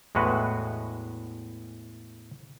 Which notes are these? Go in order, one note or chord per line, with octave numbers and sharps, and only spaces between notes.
E2 A2 G#3 F#4 B4